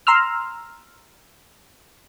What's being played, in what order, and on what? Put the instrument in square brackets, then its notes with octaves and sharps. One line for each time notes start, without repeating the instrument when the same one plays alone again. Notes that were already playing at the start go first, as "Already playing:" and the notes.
[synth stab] A#5 C6 E6 F6